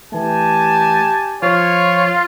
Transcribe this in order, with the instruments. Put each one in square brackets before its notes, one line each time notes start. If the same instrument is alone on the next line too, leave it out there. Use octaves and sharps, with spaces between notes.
[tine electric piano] E3 A3 [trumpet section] G4 G#5 A5
[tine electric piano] F3 F6 [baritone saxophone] F4 [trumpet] C#5